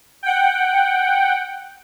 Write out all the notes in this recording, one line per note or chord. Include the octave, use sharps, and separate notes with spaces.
F#5 G5